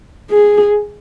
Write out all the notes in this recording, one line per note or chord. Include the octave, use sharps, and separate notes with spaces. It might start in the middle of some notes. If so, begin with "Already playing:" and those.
G#4